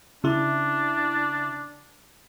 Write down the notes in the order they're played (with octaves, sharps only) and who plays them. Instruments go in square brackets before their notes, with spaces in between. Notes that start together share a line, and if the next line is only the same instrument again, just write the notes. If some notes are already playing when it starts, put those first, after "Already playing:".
[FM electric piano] C#3 E4 [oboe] D4